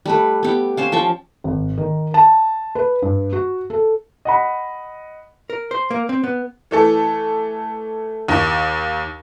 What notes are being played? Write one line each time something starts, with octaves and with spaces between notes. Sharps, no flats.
G3 A3 B4
B3 G4
C#4 C5 F5
F3 G5 A5 C#6
G#1
D#3
A5
B4
G2
F#4
A4
D#5 F#5 B5
A#4
C5
A#3
C4
B3
E3 A3 A4
D#2